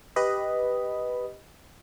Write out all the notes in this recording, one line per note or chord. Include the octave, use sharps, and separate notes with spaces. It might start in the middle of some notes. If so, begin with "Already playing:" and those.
G4 B4 D#5 B5